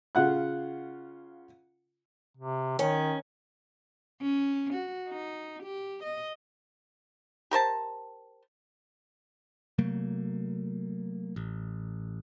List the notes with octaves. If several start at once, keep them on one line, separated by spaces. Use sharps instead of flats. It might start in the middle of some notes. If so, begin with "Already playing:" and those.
C#3 F4 F#5 F#6
C3
D#3 C#4
C#4
F#4
D#4
G4
D#5
G4 A#4 C5 A5
C3 F#3 A3 A#3
A1